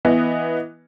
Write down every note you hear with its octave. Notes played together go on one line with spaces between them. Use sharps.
E3 B3 D#5